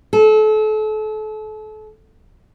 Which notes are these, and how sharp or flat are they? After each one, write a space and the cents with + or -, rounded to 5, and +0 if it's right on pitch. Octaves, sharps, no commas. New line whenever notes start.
A4 -35